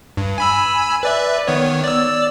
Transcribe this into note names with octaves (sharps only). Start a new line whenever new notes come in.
G2
G#5 B5 E6
B4 D5 E5
D#3 B3 C#5
D5 E6